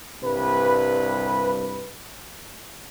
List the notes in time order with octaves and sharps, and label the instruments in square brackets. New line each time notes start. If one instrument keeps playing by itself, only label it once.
[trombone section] C2 G2 B4